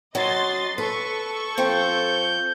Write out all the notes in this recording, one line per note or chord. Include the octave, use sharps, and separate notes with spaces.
F#3 C#4 D#5 C6 A6
A4 B4 C#6
F3 C4 G6